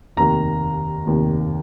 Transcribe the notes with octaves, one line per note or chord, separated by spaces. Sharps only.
F1 D#2 D#3 A#5
F1 D#2 D#3